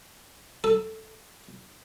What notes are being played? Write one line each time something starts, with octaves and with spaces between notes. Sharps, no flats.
A4